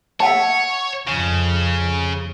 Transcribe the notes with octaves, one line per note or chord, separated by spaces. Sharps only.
C#5 E5 F#5 A5
F2 C#3